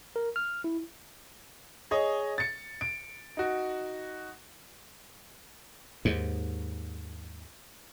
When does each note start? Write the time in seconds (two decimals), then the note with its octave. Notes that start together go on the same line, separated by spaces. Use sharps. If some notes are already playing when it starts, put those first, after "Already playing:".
0.16 A#4
0.36 F6
0.64 E4
1.91 G#4 C#5 D#5
2.38 A6 C#7
2.81 D7
3.37 D#4 F#4
6.05 D#2 G#2